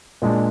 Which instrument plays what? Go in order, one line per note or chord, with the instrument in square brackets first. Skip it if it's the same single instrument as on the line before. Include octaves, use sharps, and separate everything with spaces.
[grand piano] A#2 G#3 D4